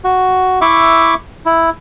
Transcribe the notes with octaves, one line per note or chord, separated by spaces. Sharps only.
F#4
E4 E5 C#6 D6
E4